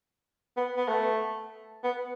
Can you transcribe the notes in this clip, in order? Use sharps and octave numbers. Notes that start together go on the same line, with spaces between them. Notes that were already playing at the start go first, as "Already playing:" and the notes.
B3
B3
A3
B3